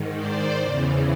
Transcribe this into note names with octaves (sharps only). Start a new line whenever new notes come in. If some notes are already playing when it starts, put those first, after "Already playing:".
Already playing: G#2 D#3
C5 D5
E2 C#3 E3